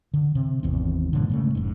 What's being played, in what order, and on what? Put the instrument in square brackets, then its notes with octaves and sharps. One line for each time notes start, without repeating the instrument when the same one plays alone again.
[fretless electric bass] D3
C3
G#1 E2 C4
G2 A#2 D3
G#2 C#3 A3
F1 G#2